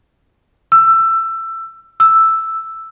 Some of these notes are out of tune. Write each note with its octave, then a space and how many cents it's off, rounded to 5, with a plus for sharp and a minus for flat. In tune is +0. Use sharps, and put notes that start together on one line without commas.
E6 +20
E6 +0